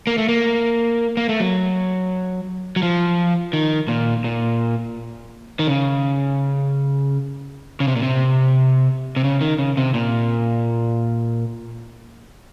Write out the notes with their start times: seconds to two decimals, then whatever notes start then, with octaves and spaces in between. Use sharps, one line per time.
0.07 A#3
0.18 A3
0.29 A#3
1.17 A#3
1.29 A3
1.40 F#3
2.76 F#3
2.82 F3
3.53 D#3
3.88 A#2
4.24 A#2
5.59 D#3
5.67 C#3
7.80 C#3
7.88 C3
7.96 A#2
8.03 C3
9.16 C3
9.24 C#3
9.41 D#3
9.59 C#3
9.77 C3
9.94 A#2